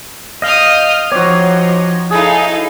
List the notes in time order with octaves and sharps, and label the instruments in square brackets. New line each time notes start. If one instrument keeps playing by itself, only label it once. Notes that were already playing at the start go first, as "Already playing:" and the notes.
[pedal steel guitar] D#5 F5 [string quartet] D#6 F6 G6
[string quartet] F3 D#4 [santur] C4 F#4 [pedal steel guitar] C#5 D6
[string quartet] D#4 A4 F5 [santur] E4 G#4